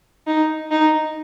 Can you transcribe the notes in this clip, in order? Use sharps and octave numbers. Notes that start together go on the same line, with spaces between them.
D#4
D#4